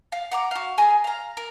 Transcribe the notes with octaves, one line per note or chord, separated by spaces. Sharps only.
F5
F#5 A#5 D6
F#4 F5
G#4 G#5 A#5
F5 A#5
A#4